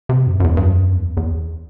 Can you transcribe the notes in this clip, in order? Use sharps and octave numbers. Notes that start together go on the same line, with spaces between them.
C3
F#2
F#2
E2
G2
F#2
E2
E2